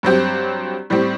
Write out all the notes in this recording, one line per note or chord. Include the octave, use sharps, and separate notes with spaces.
G2 F#3 C4 G4
A2 G3 C4 G4